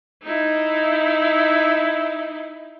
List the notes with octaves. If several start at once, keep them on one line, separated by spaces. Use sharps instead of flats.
D#4 E4